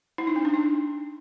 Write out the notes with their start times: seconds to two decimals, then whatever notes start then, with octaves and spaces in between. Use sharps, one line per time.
0.18 E4
0.27 D#4
0.36 C#4
0.45 D4
0.54 D#4